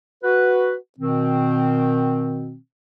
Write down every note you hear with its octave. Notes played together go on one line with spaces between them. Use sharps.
F#4 B4
B2 D#3 C4